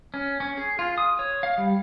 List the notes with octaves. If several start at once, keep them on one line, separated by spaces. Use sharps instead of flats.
C#4
C#4
G#4
F4
D#6
C#5
F5
G3